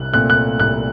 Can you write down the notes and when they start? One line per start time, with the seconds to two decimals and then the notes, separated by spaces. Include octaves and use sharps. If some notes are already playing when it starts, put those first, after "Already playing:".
Already playing: C2 F#6
0.13 A#2 A3 C4 F#6
0.30 F#6
0.60 C2 F#6